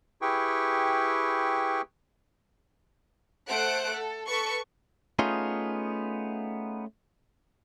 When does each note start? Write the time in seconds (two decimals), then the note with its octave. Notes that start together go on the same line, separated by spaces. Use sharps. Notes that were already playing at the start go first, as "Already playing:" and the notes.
0.22 E4 G4 G#4 B4 G5 C#6
3.47 A3 C5 F#5 F#6 D7
3.94 A4
4.27 A4 B4 C#6
5.19 A3 B3 C#4 D#4 F4 G#4